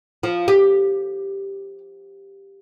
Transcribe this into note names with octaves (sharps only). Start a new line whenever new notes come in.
F3
G4